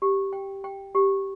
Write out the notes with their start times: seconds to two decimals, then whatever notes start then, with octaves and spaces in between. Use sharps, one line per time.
0.02 G4
0.33 G5
0.64 G5
0.95 G4